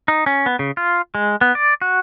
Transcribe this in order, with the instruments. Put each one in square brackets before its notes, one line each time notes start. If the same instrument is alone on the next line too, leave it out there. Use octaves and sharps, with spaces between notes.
[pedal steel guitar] D#4
C#4
B3
C#3
F4
G#3
B3
D5
F#4